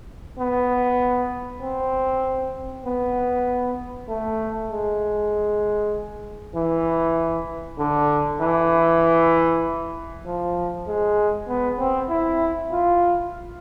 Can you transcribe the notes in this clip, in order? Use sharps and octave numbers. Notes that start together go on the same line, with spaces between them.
B3
C4
B3
A3
G#3
E3
D3
E3
F3
G#3
B3
C4
E4
F4